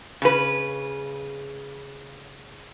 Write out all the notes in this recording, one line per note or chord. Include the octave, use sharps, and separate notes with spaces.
C#3 B4